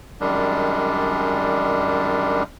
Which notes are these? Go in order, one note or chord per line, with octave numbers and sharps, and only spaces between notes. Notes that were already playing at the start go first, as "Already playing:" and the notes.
F#2 D#3 G3 G#3 D4